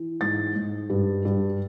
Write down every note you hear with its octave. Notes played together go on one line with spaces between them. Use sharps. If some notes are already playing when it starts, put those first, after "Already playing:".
Already playing: E3
G#2 A6
G#2
G2
G2